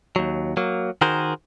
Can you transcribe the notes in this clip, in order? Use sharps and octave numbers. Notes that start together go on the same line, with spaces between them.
D#2 F#3
F#3 A#3
D#3 F#4 G#4 A#4 C5